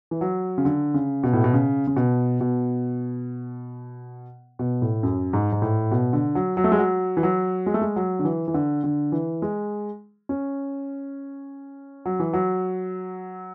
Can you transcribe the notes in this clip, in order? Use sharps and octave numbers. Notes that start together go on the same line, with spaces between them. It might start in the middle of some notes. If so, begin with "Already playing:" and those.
E3
F#3
C#3
D3
C#3
B2
A2
B2
C#3
C#3
B2
B2
B2
A2
F#2
G#2
G#2
A2
B2
D3
F#3
F#3
A3
G#3
F#3
E3
F#3
G#3
A3
G#3
F#3
D3
E3
E3
D3
D3
E3
G#3
C#4
F#3
E3
F#3